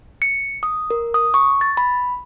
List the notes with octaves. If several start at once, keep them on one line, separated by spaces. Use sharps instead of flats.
C#7
D#6
A#4
D#6
C#6
A6
B5